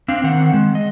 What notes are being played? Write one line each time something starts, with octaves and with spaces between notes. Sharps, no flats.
C4 D4 F5
D#3 C4 F#5
G#3
D#5